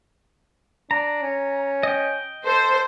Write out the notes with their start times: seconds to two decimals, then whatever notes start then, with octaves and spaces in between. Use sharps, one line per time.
0.91 D4 A#5
1.22 C#4
1.83 D#5 G5
2.46 A4 C5